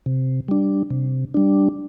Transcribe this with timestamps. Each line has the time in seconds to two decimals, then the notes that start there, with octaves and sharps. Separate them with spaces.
0.06 C3
0.48 G3 D4
0.90 C3
1.34 G3 D4